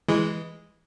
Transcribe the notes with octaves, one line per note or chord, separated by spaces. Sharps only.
E3 G#3